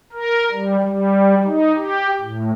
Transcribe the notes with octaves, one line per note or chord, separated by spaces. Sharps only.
A#4
G3
G3
D#4
G4
A2